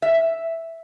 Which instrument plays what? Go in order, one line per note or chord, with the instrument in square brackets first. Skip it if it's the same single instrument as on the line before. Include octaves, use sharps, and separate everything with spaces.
[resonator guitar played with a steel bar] E5